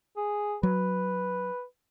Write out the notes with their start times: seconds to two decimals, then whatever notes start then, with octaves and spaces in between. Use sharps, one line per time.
0.17 G#4
0.63 F#3 B4